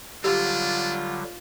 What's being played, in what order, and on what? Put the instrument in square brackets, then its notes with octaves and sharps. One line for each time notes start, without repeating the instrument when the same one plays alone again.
[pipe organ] D3 F#3 G3 [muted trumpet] D4 [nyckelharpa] F4 [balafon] G4